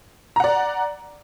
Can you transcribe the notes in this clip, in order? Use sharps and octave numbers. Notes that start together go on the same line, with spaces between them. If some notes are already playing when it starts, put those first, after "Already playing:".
D5 F#5 A#5